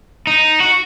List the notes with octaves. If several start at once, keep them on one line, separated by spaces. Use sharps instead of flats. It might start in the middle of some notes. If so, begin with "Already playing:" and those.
D#4
F#4